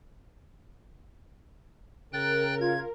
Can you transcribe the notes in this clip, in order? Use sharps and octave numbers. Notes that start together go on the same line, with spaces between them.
C#3 A#4 G5 F#6 A6
F4 G#6